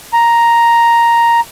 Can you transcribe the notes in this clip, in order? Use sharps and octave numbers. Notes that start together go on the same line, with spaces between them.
A#5